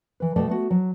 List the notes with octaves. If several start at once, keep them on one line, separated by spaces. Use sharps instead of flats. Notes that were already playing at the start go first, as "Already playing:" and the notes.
E3 B4
B2 G3 A3 A4 D5 G5
A3 B3 F#4
F#3